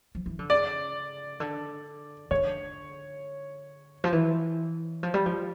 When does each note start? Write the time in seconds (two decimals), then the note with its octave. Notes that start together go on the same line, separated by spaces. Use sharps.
0.15 F3
0.26 E3
0.39 D3
0.50 C#3 D5
1.40 D3
2.31 D3 C#5
4.04 F3
4.12 E3
5.03 F3
5.14 G3
5.26 F3